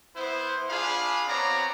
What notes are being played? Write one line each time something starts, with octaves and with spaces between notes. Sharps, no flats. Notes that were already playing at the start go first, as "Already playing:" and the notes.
B3 E4 C5
D4 F4 G#4 F5 B5
B3 C4 C#5 D5 A#5